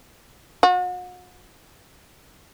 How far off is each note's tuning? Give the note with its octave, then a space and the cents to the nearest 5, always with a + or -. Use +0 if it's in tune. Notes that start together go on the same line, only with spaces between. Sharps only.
F#4 -40